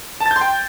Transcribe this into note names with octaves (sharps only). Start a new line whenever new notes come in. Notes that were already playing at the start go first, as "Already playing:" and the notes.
A5
A6
G6
C6
G5